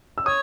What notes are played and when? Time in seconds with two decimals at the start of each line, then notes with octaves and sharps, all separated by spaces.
0.18 E6
0.26 C#5 D#6